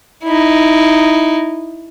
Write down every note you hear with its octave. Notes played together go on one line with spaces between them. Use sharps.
D#4 E4